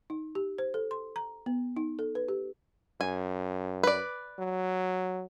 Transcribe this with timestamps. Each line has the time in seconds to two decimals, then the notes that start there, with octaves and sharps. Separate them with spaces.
0.10 D#4
0.35 G4
0.58 C5
0.74 A4
0.91 C6
1.16 A#5
1.46 B3
1.77 D#4
1.99 A4
2.15 B4
2.28 G4
3.01 F#2 G#5
3.83 B4 D5
4.39 F#3